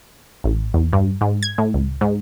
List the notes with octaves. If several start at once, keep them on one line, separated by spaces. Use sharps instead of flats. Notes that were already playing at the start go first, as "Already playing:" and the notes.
A1
E2
G2
G#2
G#6
A2
C#2
G#2